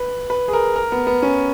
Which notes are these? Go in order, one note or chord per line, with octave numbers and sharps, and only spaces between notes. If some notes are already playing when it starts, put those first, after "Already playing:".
Already playing: B4
B4
G#4
A#4
A#4
B3
B3
C#4